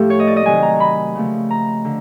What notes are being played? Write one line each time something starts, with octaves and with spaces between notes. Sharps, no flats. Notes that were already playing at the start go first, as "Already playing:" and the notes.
Already playing: A2 F3 A3 G4 A4
C#5
D#5
D5
D#5
C3 D#3 F#3 A3 G#5
A#5
B5
C#3 F3 A3
A#5
D3